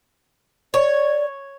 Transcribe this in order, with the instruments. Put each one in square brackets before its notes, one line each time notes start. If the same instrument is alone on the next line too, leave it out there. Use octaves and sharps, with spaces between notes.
[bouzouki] C#5 [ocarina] D5